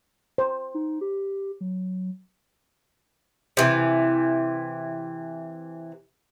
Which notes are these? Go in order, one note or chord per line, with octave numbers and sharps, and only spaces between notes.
C5
D#4
G4
F#3
C3 E3